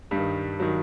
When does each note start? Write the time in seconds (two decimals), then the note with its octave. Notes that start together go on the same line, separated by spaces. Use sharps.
0.11 G2 D#3 G3
0.60 D#3 F#3